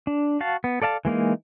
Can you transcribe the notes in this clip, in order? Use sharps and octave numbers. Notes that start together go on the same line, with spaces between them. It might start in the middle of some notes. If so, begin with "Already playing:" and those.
D4
F#4 F5 A5
B3
A4 D5 F5 A5
E3 G#3 A#3 D#4